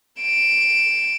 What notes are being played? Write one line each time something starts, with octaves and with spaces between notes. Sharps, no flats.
D7 E7